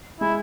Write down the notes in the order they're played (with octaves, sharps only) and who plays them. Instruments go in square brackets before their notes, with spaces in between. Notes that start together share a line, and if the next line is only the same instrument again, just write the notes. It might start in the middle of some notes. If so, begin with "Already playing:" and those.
[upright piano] G#3 [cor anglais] E4